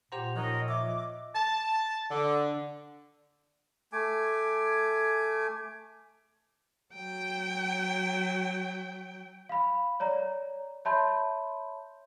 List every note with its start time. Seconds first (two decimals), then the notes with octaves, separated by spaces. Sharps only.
0.12 A#2 G4 C5 F#5 A#5 F7
0.36 F3 D#4 A#4 C#5 D#5 F#6
0.66 D#5 E5 D6 E6
1.35 A5
2.11 D3
3.93 A3 G#5 D6
6.94 F#3 G5
9.49 F5 B5
10.00 C#5 D5 A#5
10.85 C#5 E5 A5 B5 C6 G6